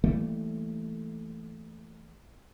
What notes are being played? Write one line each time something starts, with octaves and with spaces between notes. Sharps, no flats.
E3 G3 A3 A#3